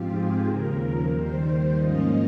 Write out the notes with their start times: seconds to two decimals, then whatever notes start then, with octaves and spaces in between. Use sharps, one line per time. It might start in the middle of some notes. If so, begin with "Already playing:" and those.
Already playing: G#2 F3 C4 F4 G4
0.10 G#4
0.43 D#2 C#3 F3 A#4
1.10 D#2 D#3 G3 C5
1.76 G#2 F3 A#3 C#4 F4 D#5